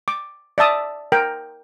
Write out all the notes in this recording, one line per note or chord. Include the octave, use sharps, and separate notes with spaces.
D6
D5 E5 A5 D#6
A#4 G5